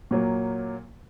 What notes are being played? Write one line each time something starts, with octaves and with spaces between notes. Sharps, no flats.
A#2 F#3 A#3